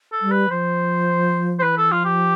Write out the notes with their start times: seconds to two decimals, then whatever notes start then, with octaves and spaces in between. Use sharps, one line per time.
0.12 A4
0.22 G3
0.31 B4
0.50 F3 C5
1.59 C5
1.62 E3 B4
1.78 A4
1.91 F3 F4
2.05 G4